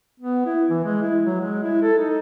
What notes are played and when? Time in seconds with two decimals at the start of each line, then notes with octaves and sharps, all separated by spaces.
0.20 B3
0.46 E4
0.70 E3
0.85 G#3
1.02 E4
1.25 F#3
1.41 G#3
1.62 E4
1.82 A4
1.98 D#4